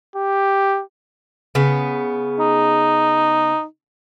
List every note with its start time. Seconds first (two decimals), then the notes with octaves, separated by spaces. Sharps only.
0.16 G4
1.55 C#3 B3
2.40 D#4